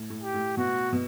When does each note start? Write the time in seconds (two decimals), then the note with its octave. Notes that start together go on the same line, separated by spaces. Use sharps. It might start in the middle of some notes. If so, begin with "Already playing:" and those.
Already playing: A2
0.10 A2
0.22 G4
0.34 A2
0.57 B2 F#4
0.92 B2